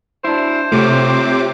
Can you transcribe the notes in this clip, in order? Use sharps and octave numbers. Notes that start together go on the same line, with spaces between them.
D4 E4 C5
C3 A3 F4 C#5 D6